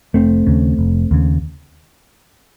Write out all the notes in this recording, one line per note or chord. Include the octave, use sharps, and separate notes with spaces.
F1 A3 C4
D#2 C#3
F1
D#2 C#3